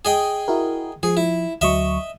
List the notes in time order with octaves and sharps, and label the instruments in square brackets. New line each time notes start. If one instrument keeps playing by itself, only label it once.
[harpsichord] G#4 D#5 G5
[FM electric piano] E4 F#4 A#4
[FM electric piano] F3 [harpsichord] G#4
[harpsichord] E4
[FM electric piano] D2 F#3 C#6 [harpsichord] D#5 E5